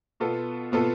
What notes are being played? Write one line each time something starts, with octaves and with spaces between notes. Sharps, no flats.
B2 B3 F4 A4
B2 B3 F4 A4